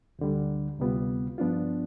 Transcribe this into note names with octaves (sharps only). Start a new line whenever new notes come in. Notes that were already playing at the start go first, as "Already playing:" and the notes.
D2 D3 G3
D2 C3 G3 B3 F4
G2 F3 B3 D4 F4